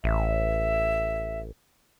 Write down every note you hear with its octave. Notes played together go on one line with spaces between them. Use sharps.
A1 E5